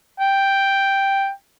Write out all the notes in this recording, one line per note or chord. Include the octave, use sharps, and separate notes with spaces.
G5